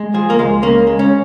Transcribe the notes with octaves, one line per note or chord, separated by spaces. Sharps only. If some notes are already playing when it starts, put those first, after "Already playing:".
Already playing: G#3
F3 G#4
A#3
C#2 G#3
C#3 A#3
G#3
C#4